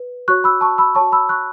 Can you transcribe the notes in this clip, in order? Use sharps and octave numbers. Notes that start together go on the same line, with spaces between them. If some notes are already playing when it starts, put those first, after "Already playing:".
Already playing: B4
F#4 C#5 C#6 F#6
B5 E6
A5 C#6
B5 E6
C#5 A5 C#6
F#4
B5 E6
C#6 F#6